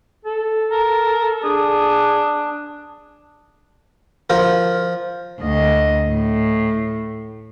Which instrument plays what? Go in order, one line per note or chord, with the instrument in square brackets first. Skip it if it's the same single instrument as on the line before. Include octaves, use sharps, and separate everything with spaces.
[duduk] A4
[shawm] A#4
[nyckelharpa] D4 [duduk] G#4 [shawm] D#6
[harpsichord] F3 A#4
[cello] D2 D#5
A2